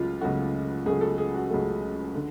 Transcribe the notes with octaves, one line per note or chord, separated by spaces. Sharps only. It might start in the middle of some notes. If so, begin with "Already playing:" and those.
Already playing: C#2 C#3 F#3 A3 F4
C#2 C#3 F#3 A3 F#4
C#2 C#3 F#3 A3 G#4
A4
G#4
F#4
C#2 C#3 F#3 A3
D3